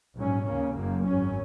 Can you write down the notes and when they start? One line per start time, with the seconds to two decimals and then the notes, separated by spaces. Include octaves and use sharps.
0.16 A#1 G#2 F#3 C#4
0.46 D#2 C#3 A#3 C#4
0.76 F#1 F#2 F#3 A#3
1.07 G#1 F#2 F#3 C#4